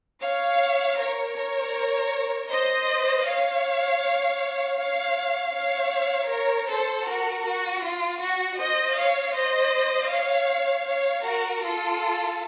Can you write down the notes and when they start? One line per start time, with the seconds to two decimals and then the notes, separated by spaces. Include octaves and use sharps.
0.20 C#5 F5
0.96 A#4 C#5
1.35 A#4 C#5
2.49 C5 D#5
3.25 C#5 F5
4.77 C#5 F5
5.54 C#5 F5
6.30 A#4 C#5
6.68 A4 C5
7.06 F#4 A#4
7.45 F#4
7.83 F4
8.21 F#4
8.59 C5 D#5
8.97 C#5 F5
9.35 C5 D#5
10.10 C#5 F5
10.87 C#5 F5
11.25 F#4 A#4
11.63 F4 A4